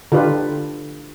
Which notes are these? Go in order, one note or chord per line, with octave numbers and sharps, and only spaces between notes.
D3 F4 G4 B4